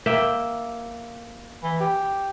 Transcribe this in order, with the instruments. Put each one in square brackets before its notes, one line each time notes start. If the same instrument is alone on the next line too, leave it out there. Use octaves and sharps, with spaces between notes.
[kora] A#3 E5 G5
[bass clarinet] E3
G4